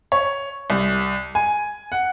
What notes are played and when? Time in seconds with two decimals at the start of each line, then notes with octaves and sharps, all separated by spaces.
0.12 C#5
0.70 C2
1.35 G#5
1.92 F#5